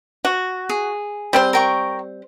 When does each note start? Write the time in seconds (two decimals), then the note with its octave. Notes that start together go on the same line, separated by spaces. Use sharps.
0.25 F#4
0.69 G#4
1.33 G3 C4 C5
1.53 A#4 G5 C#6